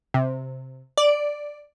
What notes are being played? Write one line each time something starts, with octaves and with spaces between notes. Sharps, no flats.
C3
D5